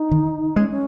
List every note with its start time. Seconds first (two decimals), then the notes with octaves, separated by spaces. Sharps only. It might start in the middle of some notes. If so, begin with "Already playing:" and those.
Already playing: D#4
0.11 D#3
0.56 G#3 C#4
0.71 C#4